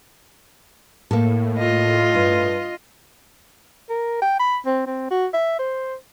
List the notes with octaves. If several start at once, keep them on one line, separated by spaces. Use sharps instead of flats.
A2 A#3 A4
F4 D#5
G2
A#4
G5
B5
C4
C4
F#4
E5
C5